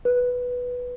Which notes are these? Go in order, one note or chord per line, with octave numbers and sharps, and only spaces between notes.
B4